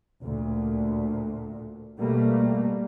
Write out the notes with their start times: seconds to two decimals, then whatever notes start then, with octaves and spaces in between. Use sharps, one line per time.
0.22 D2 A#2
2.00 B2 G3 A3 A#3